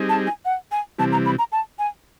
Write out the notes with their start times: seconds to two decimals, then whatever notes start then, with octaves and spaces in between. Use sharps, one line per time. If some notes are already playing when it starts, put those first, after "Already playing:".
Already playing: G3 C4 D#4 G#4
0.09 A5
0.27 G#5
0.45 F#5
0.72 G#5
0.98 C3 E3 G3 C4 A5
1.12 A#5
1.26 B5
1.39 A#5
1.52 A5
1.79 G#5